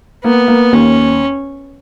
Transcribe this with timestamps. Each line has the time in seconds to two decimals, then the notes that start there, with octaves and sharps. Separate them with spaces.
0.24 A#3 B3
0.48 A#3
0.72 D#2 C#4